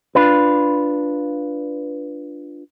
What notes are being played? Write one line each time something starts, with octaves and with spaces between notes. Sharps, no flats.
D4 F4 B4